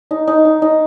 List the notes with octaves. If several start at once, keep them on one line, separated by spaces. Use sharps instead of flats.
D#4
D#4
D#4
D#4